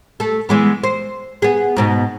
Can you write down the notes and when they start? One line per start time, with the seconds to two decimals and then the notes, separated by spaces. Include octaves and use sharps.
0.20 A3 A4
0.49 E3 G#3 B3
0.83 C5
1.42 B3 G#4
1.76 G#2 B2 B3